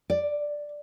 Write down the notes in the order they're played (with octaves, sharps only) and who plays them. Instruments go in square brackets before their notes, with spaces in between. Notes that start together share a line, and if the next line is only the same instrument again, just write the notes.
[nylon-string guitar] D5